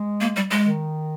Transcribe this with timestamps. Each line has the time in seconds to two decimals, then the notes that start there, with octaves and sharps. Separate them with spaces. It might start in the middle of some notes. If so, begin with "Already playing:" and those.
Already playing: G#3
0.21 A#3
0.36 G3
0.51 G#3
0.66 D#3